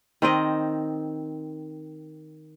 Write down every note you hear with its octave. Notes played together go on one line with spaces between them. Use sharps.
D#3 C4 D#5